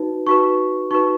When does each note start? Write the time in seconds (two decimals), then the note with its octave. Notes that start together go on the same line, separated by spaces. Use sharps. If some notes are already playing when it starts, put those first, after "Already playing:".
Already playing: D#4 F#4 B4
0.27 D#4 F#4 B4 C#6
0.91 D#4 F#4 B4 C#6